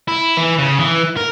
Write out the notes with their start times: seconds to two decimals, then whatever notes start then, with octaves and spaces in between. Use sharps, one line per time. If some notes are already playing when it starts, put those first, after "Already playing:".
0.08 E4
0.37 E3
0.59 C#3
0.79 E3
1.17 A#4